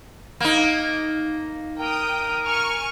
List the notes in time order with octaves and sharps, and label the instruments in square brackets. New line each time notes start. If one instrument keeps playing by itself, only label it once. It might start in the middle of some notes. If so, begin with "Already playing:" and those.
[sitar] A#3 D#4
[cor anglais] A#4 [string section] G5 D#6
[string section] G#5 C#6 F6